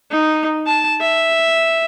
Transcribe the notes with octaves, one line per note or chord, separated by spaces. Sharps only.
D#4
A5
E5